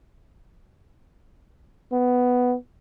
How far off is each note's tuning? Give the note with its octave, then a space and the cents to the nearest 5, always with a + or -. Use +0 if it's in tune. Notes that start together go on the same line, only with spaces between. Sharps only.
B3 +5